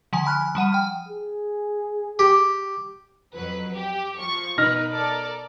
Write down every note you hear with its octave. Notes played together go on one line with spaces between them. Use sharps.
D3 F3 G#5
G#5 B5 F6 F#6
F3 G3 F#5 D#7
G5 F6
G#4
G4
F2 F#3 B4
G4
F3 C#6
B2 D#4 A#4 B4 F6 A#6
A4 A#4 D5